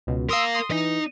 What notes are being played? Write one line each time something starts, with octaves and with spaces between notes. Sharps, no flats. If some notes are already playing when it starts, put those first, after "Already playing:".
C#2 B2
A#4 F5 C6 D#6 E6
C6 D#6
E3 D#4 D#5